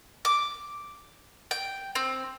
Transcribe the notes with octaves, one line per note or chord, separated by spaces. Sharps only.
D6
G5
C4